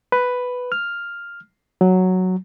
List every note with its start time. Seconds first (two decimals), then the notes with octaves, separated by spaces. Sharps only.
0.12 B4
0.72 F6
1.81 F#3